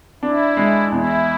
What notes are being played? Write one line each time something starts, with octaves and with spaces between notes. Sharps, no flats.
D4 E4
G#3
E2 E4